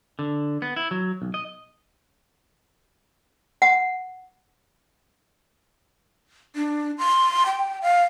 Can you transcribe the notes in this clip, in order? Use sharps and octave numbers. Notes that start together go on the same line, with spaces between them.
D3
B3
E4
F#3
B1
D#5
F#5
D4
C6
G5
F5